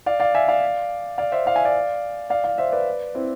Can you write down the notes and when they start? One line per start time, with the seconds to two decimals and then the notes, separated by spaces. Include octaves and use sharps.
0.06 D5 F5
0.20 D5 F5
0.35 E5 G#5
0.48 D5 F5
1.18 D5 F5
1.32 C5 E5
1.46 D5 F5
1.55 E5 G#5
1.65 D5 F5
2.30 D5 F5
2.44 D5 F5
2.58 C5 E5
2.72 B4 D5
3.15 C4 E4